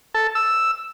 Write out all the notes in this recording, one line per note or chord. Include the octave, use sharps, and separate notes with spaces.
A4
E6